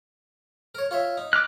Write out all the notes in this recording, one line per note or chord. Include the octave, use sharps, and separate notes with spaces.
A#4 C#5
F4 C#5 E5
D#4
D6 F6 F#6